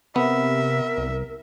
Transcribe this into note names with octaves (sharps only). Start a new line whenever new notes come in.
C3 B3 A#4 E5
C2